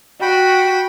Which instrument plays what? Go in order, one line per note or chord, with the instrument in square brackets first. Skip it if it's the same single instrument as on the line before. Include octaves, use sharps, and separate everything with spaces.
[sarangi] F#4 [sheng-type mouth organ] G5 B5